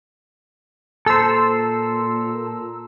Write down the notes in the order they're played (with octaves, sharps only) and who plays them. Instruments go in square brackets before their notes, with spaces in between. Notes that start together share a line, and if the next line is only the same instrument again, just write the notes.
[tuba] A#2 [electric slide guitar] A4 C5 [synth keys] A#5 E6